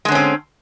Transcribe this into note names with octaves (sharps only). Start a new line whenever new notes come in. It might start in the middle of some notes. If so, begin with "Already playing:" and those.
D3 G#3 C4 C#4